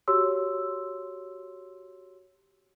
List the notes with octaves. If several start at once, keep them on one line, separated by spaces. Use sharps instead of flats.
F#4 G4 C#5 C6 E6